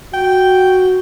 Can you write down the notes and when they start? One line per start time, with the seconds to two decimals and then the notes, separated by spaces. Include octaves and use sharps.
0.14 F#4 G5